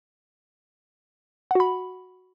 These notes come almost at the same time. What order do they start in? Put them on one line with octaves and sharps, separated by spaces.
F#5 F#4 B5